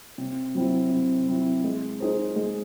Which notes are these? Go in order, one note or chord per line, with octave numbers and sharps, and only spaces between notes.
C3
F#3 C4 E4
C3
F#3 C4 E4
G#3
D#4 G#4 C5
G#3